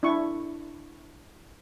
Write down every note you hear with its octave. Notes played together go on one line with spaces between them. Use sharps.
D4 E4 C#6